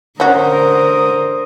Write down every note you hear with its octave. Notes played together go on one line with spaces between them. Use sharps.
D3 C#4 F#4 A#4 C5 D#6